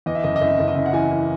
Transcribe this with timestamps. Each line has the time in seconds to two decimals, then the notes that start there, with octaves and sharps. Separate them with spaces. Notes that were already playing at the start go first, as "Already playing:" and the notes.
0.06 E2 D#5
0.15 E5
0.23 F#1 D#5
0.36 D#5
0.41 F#1 E5
0.59 F#1
0.68 D#5
0.76 C#3 E5
0.86 F#5
0.93 E3 G#5
1.11 E3